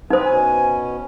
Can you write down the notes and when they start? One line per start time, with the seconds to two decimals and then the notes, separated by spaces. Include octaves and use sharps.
0.10 C4 D#4 B4 C5
0.25 B2 C#4 G#5